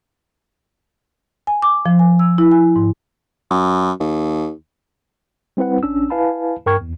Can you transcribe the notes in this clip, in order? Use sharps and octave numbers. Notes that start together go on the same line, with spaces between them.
G#5
D6
F3
G#5
E6
E4
G#5
G#2
F#2
D#2
G3 C4 E4 B4 F#5
A1 C#4 D4 E6
E4 B4 F5 G#5 A5 B5
G2 A#4 G5 C#6 F6 G#6
E2